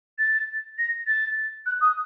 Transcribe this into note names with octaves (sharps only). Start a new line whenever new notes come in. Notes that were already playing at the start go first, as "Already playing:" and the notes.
A6
A#6
A6
F#6
D#6